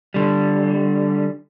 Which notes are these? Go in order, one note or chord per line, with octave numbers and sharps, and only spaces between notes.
D3 G3